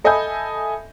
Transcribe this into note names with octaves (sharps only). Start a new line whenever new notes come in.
A4 D#5 E5 G#5 B5 G6